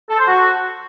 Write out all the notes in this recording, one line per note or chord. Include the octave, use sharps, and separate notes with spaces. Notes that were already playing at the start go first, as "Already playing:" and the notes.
A4
C5
F#4